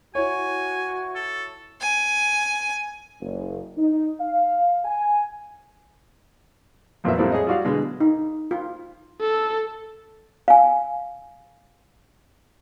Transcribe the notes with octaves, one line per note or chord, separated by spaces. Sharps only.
E4 F#4 C#5 G#5
A4
G#5
F#1
D#4
F5
G#5
A1 F2 A#2 F#3 B3 E5
A#1 A2 G3 C4 E4 A4
G#4 C#5 D#5
G3 F4 F#4 D5 F5
B2 D3 G#3
D#4
F4
A4
F5 G#5